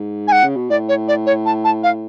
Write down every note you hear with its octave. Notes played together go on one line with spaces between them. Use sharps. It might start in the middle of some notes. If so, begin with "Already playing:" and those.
Already playing: G#2
G#5
F#5
C#3
B2
A2 D5
C#5
D5
C#5
A5
A5
F5